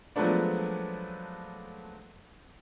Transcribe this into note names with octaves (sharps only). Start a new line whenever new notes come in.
F3 F#3 G#3 A3 B3 D4